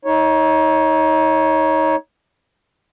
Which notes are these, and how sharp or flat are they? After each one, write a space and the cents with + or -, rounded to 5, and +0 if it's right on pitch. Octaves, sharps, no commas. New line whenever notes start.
D#4 +25 C#5 +0